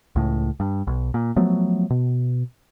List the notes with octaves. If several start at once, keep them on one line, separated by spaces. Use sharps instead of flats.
C#2 A2
G2
B1
A#2
F3 F#3 A3 B3
B2